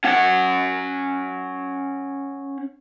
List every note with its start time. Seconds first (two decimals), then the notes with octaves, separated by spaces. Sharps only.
0.04 C#4 F#5